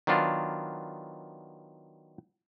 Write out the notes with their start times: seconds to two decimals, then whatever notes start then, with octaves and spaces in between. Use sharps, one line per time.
0.07 D#3 F#3 B3 D4 F4